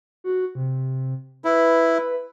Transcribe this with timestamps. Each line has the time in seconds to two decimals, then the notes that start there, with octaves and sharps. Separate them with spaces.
0.24 F#4
0.55 C3
1.44 E4 B4